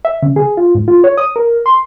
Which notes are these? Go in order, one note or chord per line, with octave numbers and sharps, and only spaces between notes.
E5
C#3
G#4
F4
G#2
F4
C#5
D#6
A#4
C6